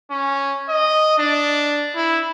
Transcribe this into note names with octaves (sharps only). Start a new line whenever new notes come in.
C#4
D#5
D4
E4